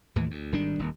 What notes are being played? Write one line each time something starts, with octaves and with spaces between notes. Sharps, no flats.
D#2 A2 E3
D2
G#1 D#3 G3 D4
D#1 D#2